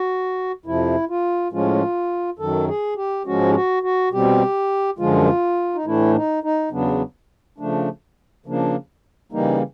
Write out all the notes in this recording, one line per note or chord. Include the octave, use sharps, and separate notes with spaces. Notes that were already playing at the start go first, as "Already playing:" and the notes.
Already playing: F#4
F2 C3 F3 E4
F4
A2 F3 G#3 C#4 F4
F#2 D#3 F#3 A4
G#4
G4
G#2 F3 G#3 C#4 F#4
G4
F#4
F#4
B2 G3 C4 G4
F#2 D3 F3 G#3 F4
D#4
A2 E3 A3 D4 E4
D#4
D#4
E2 C#3 F#3 B3 D4
C#3 F3 A3 D4
C#3 F3 A#3 D4
C#3 E3 G3 A#3 D#4